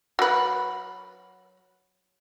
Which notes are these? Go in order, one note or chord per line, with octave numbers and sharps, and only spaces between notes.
F#3 B4